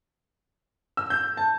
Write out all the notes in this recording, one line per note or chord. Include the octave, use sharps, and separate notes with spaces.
E6
G6
A5